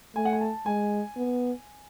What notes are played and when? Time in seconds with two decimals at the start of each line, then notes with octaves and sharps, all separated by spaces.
0.16 A3 G#5
0.25 F#5
0.33 G#5
0.41 A5
0.66 G#3 G#5
1.17 B3